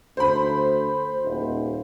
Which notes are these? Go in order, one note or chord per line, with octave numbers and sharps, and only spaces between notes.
D2 C5 B5
D#1